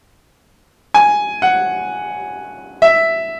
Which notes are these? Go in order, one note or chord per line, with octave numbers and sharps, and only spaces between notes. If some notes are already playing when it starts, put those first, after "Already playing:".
G#5
F#5
E5